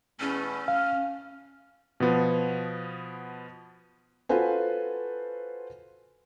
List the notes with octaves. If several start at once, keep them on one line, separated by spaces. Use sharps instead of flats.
E2 B2 A3 C#4
F5 F6
B2 F3 B3
F4 F#4 A4 B4 C5 G#5